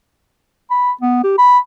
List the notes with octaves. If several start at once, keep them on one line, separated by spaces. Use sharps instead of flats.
B5
B3
G4
B5